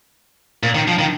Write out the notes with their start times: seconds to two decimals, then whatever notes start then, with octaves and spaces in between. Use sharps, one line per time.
0.63 A#2
0.75 D#3
0.88 F3
0.99 D#3